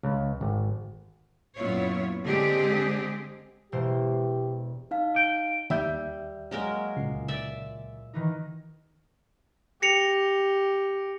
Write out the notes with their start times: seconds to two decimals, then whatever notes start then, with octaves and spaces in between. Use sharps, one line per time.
0.03 C#2
0.41 G#1
1.55 F#2 A#2 B3 E4 F4 C#5
2.25 D3 G#3 C4 G4 G#4
3.72 E1 G4 C5
4.91 D#4 F5
5.16 G5
5.70 D#2 G3 E5 G6
6.51 F#3 G#3 A#3 A#4
6.97 C#2 A#2 C7
7.28 D5 E5
8.14 D#3 E3 D#4
9.82 G4 A#6 C#7 F7